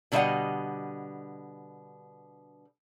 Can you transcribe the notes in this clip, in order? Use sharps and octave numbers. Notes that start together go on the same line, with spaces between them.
B2 D3 G3 D#5 F5 F#5